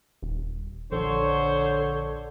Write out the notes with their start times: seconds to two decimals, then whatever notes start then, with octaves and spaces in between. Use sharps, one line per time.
0.22 D#1
0.92 A#1 D3 A4 C5 C#5